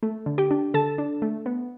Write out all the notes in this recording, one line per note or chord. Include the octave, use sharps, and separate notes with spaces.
A3
D3
G4 G5
D4
D3 A4 A5
D4
A3
B3